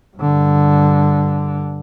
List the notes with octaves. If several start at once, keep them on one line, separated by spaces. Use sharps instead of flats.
G2 D3